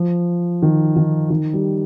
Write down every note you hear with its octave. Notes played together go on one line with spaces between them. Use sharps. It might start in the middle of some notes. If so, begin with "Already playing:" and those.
Already playing: F3
D#3
D#3
D#3
G3